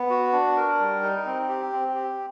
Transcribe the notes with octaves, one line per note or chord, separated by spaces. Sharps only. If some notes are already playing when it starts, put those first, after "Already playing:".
Already playing: B3
F#4
D4
A#4
G3
D#4
C4
G4
C4
G4